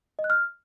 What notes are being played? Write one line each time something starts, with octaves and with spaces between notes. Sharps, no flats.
D#5
F#6
F6